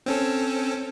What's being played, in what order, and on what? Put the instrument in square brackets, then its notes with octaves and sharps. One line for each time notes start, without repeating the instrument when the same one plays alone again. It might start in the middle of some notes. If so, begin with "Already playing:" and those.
[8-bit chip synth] C4 C#4 A4